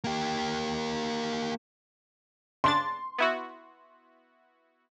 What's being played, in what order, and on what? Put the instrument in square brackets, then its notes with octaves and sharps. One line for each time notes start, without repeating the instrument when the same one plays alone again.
[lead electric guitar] A#3 G4
[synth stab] C#3 D4 A6 [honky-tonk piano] C6
[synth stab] B3 E4 F#4